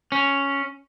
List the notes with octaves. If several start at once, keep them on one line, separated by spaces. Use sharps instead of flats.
C#4